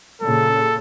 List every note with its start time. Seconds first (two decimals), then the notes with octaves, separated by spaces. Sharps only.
0.22 A#2 C#3 A4